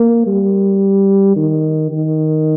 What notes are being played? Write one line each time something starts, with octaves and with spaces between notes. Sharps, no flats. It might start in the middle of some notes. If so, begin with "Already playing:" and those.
Already playing: A#3
G3
D#3
D#3